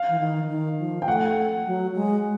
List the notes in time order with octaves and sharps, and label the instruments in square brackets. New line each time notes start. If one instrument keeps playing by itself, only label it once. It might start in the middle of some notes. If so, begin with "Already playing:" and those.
Already playing: [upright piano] F5
[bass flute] E3
D#3
D#3
F3
[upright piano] G5
[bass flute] A3 [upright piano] F#5
[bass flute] F#3
G#3